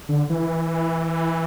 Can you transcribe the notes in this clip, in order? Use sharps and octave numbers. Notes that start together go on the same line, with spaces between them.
D3
E3